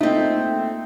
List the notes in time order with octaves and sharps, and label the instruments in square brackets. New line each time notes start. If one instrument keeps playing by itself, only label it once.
[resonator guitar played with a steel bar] A3 C4 [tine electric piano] A#3 F4 E5 [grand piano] D#4